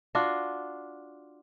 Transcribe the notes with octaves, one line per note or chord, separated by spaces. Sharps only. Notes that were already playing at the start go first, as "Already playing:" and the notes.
D4 F4 F#4